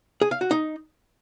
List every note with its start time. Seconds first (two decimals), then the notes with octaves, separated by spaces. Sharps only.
0.22 G#4
0.31 F5
0.41 F#4
0.51 D#4